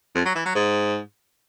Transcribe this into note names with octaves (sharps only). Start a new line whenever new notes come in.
F2
F#3
E3
F#3
G#2